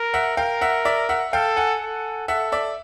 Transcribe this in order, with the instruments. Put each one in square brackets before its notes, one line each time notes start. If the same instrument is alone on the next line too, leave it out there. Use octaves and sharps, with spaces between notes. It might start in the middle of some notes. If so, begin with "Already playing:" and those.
Already playing: [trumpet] A#4
[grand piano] E5 F#5
[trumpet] A#4 [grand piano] F5 G5
[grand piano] E5 F#5
D5 E5
E5 F#5
[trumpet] A4 [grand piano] F5 G5
[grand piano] F#5 G#5
[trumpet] A4
[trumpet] A4 [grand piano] E5 F#5
[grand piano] D5 E5